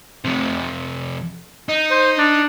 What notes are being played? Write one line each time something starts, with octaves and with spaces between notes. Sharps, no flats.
F2 C3
D#4
C5
D4